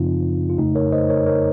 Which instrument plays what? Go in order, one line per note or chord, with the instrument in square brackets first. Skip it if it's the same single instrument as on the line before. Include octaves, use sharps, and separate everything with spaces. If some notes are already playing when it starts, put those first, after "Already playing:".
Already playing: [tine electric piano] F#2 C#3 F3 C4 D#4 F4
F4
F2 C#3 A3 D#4
A#4 C#5
C5 D#5
A#4 C#5
A#4 C#5